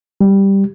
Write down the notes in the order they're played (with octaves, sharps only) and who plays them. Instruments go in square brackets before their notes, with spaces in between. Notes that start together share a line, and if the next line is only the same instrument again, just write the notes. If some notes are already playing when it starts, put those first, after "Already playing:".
[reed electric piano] G3